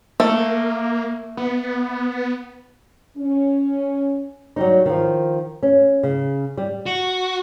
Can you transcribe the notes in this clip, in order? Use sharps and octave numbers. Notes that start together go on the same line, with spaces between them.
A3 A#3
B3
C#4
F#3 G3 D#4
D#3 F3
C#4
C#3
G3
F#4